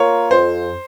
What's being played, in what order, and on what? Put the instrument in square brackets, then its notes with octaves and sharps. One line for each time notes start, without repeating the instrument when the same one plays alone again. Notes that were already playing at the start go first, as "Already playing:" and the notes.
Already playing: [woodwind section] A#3 F4 A#4 [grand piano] C#5
[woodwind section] F2 [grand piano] C5